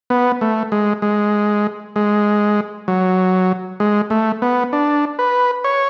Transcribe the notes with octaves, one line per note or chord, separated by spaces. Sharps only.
B3
A3
G#3
G#3
G#3
F#3
G#3
A3
B3
D4
B4
C#5